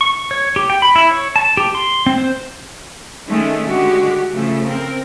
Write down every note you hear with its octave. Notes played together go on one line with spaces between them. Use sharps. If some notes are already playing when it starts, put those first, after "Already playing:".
C#6
C#5
G4
G5
B5
E4
C#5
A5
G4
C6
C4
C5
D#3 G#3 A3 C#4
D3 G#3 F#4 G4
C#3 F3 A3
C4 A#4